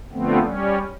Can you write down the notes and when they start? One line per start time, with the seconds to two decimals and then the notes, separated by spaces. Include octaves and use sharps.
0.12 D3 F3 A3 B3 C4
0.43 G3 C#4